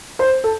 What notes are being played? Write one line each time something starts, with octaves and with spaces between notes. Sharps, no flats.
C5
A4